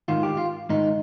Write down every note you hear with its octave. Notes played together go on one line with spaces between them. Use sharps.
G#2 D#3 F4
G4
F4
G#2 D#3 D#4